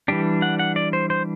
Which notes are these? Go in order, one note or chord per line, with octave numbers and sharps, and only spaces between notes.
E3 G3 D4 G4
F#5
F#5
D5
C5
C5